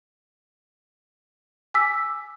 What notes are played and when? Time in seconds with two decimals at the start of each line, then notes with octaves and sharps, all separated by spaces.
1.74 G#5 D6 E6 B6